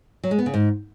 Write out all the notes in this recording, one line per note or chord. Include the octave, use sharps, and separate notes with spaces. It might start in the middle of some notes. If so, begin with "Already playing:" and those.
F#3
G#3
B3
C#3
G#2